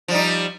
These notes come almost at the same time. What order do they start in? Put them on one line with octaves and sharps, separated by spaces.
F3 G3 D#4